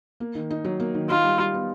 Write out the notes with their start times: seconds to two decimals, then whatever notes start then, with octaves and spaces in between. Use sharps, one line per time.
0.20 A#3
0.35 D#3
0.50 D#4
0.65 F#3
0.80 A#3
0.94 D#3
1.09 D#4 F4
1.24 G3
1.39 G3
1.54 B3